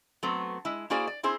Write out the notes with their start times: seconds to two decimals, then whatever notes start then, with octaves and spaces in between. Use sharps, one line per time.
0.23 F#3 A3 B3 C4
0.65 G#3 E4
0.90 A#3 E4 F#4 G#4 C5 D5
1.07 D5
1.23 C4 E4 G#4 C5